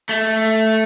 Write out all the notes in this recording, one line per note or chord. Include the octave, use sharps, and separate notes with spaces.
A3